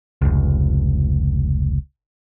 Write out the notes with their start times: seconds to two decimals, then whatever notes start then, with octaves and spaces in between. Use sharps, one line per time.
0.21 F1 C#2